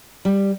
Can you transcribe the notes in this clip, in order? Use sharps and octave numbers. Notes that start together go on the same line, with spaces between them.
G3